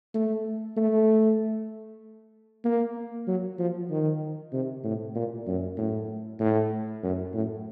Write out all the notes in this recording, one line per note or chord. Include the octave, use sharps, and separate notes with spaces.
A3
A3
A#3
F#3
F3
D#3
C3
A2
A#2
F#2
A2
A2
F#2
A2